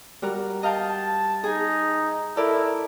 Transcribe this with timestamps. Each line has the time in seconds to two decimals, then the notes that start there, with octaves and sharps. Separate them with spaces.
0.22 G3 F#4 A#4
0.63 D#5 F5 G5 A5
1.44 D#4 G#4 G#5
2.37 E4 A4 A#4 D5